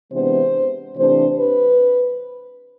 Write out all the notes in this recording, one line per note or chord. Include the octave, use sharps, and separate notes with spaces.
C3 E3 G#3 B3 D4 C5
C3 E3 A3 D4 C5
B4